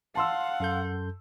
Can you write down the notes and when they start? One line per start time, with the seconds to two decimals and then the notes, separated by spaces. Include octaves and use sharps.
0.15 F5 F#5 A5 C6 E6
0.60 F#2 A4 G6